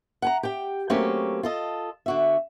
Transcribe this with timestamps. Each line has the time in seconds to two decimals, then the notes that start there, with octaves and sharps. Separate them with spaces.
0.22 F#5 G#5 A#5
0.43 G4 G5
0.90 F#3 A3 A#3 C4 C#4 G4
1.43 F4 A4 D#5
2.06 D3 F#4 E5